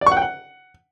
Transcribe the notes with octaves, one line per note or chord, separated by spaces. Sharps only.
D5
C#6
F#5
G5
F#5